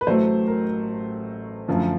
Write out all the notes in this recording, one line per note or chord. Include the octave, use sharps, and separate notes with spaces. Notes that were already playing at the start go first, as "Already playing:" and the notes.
B4
A1 A2 F#3 A3 C5
A#4
F#2 D3 F3 A3